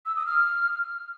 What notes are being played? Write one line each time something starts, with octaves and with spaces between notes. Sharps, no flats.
E6
D#6
F6